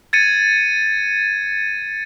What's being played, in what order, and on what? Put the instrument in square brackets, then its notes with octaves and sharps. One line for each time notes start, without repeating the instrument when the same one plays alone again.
[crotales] G#6 A6 C#7 D#7